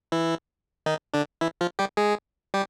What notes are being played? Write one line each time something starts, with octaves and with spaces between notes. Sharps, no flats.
E3 E4
D#3 D#4
D3 D4
E3 E4
F3 F4
G3 G4
G#3 G#4
G3 G4